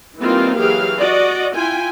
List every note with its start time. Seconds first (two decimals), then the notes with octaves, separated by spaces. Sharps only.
0.19 E3 G3 A#3 C4 D#4 F4
0.57 E3 F#3 G4 G#4 F5
0.98 F#4 D5 D#5
1.54 E4 F4 G5 G#5